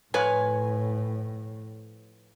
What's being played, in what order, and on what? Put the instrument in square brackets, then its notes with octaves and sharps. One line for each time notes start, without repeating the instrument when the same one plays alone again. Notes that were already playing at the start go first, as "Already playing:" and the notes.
[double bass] A2 [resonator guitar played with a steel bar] F3 B4 C#5 [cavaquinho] G#5